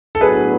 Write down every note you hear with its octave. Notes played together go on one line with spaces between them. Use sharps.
A4
A2 F#3 B3 D4 G#4 B4